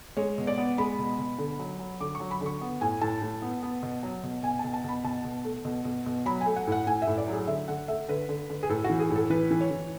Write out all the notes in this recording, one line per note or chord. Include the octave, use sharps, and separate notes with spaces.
G#3 C#5
B2
D5
B3
G#3 B5
B2
B2
D3
F#3
F#3
D3 D6
C#6
F#3
B5
D3
C#6
B3
A2 G#5
A2 A5
A2
B3
B3
B2
F#3
B2
B2 G#5
B2 A5
A5
B2 B5
B2 A5
B2
A3
B2
B2
B2
F#3 B5
G#5
A3
F#5
A2 F#5
A2 G#5
E5
A2
D5
F#3
G#4
D3 E5
D3 F#5
A3 E5
D3 B4
D3
D3
G#4
A2 A4
F#4
E3
G#4
A2
A4
E3 B4
E3
C#5
E3